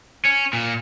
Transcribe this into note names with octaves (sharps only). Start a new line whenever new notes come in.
C#4
A#2